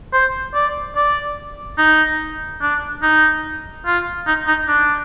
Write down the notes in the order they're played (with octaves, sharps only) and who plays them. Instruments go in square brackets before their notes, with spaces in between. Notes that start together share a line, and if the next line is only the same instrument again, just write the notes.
[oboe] C5
D5
D5
D#4
D4
D#4
F4
D#4
D#4
D4